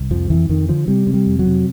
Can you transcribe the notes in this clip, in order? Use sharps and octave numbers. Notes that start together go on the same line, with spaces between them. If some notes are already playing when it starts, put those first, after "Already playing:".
Already playing: C2
F2 F3
F2 E3
F2 D#3
D3 F3
C3 G3
C3
G3
F2
F#3
C3